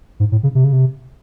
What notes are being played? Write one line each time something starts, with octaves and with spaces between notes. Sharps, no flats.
G#2
A2
C#3
C3
C#3
C3